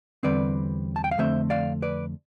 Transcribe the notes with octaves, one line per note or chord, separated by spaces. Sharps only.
E2 D3 G3 C4 B4 D5
A5
G5
F5
F2 D3 A3 C4 C5 E5
D5 F5
B4 D5